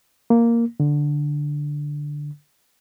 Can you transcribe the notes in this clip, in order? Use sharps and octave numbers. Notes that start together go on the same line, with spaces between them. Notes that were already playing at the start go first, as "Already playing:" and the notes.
A#3
D3